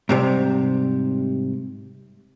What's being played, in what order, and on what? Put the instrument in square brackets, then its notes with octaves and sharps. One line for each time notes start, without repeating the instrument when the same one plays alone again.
[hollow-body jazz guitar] G#2 C3 G3